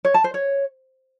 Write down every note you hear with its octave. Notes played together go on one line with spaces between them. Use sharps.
C#5
A5
C5
C#5